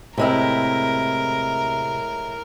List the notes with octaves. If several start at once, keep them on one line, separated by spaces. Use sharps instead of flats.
A2 C3 G#3 E4 A#4